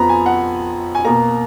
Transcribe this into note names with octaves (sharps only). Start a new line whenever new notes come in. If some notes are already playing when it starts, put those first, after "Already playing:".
Already playing: F2 F3 B3 A#5 B5
G#5
F#5
G#5
B2 A#3 A#5